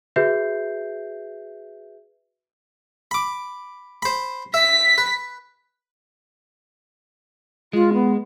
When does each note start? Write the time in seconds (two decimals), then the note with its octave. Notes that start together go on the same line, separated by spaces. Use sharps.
0.16 F#4 G#4 B4 E5 G6 C7
3.11 B5 D6
4.02 C5 B5
4.54 E5 B6
4.98 B4
7.73 G#3 F4
7.93 B3